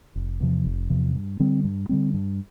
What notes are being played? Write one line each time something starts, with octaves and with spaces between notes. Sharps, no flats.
F1
E2 C3 F3
F1
E2 C3 F3
G2
D3 G3 C4
G2
D3 G3 C4
G2